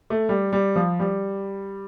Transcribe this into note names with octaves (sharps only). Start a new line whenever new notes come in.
A3
G3
G3
F3
G3